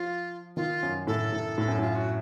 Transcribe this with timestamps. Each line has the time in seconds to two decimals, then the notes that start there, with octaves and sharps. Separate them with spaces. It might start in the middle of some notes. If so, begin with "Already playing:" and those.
Already playing: F3 F4
0.56 D#3 F4
0.83 F#2
1.07 A2 A4
1.32 A2
1.58 A2
1.68 F#2
1.79 A2 F4
1.95 F#4